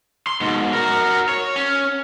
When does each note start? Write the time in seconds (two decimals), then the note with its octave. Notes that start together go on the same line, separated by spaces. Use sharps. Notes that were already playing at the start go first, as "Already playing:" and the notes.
0.27 C6
0.41 G#2 B2
0.73 F#4 A#4
1.29 C#5
1.56 C#4